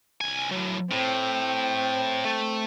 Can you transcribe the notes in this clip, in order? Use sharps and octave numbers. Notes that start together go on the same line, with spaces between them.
C2 G#5
A2 F#3
A2 C4
A3